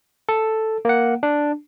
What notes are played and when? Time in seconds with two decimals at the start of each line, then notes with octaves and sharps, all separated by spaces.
0.29 A4
0.85 A#3 F#5
1.23 D4